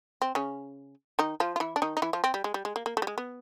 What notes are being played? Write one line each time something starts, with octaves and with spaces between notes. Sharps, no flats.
C4
C#3 C#4
D#3 D#4
F3 F4
F4
E3 E4
D4
D#3 D#4
D#4
E3 E4
F3 F4
C4
G3
G#3
G3
G#3
A#3
A#3
A3
G3
G#3
B3